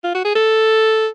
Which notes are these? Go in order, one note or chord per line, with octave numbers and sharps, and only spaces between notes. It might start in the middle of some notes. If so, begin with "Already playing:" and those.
F4
F#4
G#4
A4